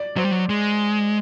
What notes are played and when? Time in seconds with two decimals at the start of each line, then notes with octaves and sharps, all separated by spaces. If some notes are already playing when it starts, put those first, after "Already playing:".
Already playing: D5
0.17 F#3 C5
0.24 G3
0.31 F#3
0.49 G#3